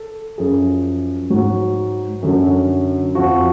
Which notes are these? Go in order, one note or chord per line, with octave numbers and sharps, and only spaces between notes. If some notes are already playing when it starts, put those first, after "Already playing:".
Already playing: A4
F#2 F3 G#4
G#2 F#3 F#4
F#2 D3 F#3
F2 F3 F#4